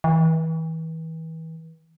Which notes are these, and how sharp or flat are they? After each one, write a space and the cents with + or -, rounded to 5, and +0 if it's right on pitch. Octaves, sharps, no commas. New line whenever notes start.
E3 -35